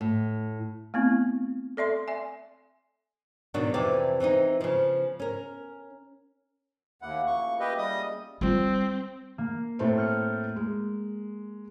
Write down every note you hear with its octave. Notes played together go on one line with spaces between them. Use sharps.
A2
A3 B3 C4 E4
A4 D5 E5 C6
D5 E5 G#5
B2 D#3 F#3 D4 F#4
F2 C3 E3 G4 D5
E3 C4 D4 D#4
C#3 F3
C#4 A#4
D#2 A#3 E4 F#5
C#3 F3 C#6
G4 B4 D#5 E5
G3 D#5 D#6
G3 C4 F4
A#3
A2 A3 C4
F6 G6 C#7
G#3